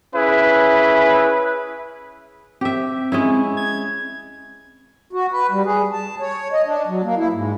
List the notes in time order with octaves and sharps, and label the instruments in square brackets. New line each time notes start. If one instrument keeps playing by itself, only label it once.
[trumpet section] C#4 E4 G#4 B4
[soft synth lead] C4 [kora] G4 E5
[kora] G#3 C#4 E4
[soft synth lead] G#6
[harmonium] F#4
B4
G3
G#4
A5
C#5
D#5
D4
F#3
A#3
E4
G#2